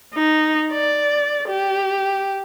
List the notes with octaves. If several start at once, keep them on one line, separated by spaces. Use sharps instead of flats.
D#4
D5
G4